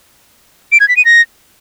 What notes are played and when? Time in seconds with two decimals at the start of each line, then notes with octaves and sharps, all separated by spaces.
0.72 D7
0.80 G#6
0.89 B6
0.97 D#7
1.05 A#6